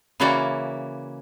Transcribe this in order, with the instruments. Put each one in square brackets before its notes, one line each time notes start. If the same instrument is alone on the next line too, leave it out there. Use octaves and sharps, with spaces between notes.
[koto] C#3 E3 A#3 E4 F#4 D5